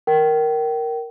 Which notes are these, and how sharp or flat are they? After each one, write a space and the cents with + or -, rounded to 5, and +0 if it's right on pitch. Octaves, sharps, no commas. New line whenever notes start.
A#4 +0 G5 -30